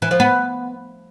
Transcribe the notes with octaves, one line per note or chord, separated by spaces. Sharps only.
E3
F3
B3